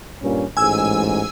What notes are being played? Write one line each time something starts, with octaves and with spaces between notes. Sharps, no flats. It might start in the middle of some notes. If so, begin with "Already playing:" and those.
G2 A#2 C#4
A1 G#2 G#3 G#5 E6